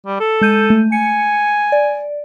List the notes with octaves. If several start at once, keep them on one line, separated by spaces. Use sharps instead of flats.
G3
A4
G#3 G6 D#7
A3
G#5 C#7
D5